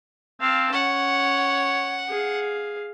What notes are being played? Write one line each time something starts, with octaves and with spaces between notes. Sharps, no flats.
C4 F5 A5
C#4 C#5 F#5
G#4 F5